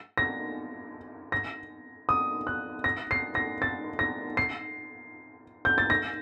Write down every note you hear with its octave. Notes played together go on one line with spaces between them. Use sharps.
A#6
A#6
D#6
F#6
A#6
C7
A#6
A6
A#6
C7
G6
A6
A#6